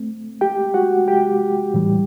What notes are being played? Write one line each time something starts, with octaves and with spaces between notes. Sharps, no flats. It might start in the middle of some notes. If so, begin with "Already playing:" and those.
Already playing: A3 C4
G4 G5
F#4 F#5
G4 G5
A2 E3 G3